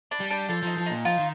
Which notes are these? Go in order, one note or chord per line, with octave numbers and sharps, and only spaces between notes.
D4
G3
D4
F3 A4
F3 D#4
F3
A#2 D#4
F3 F4
D#3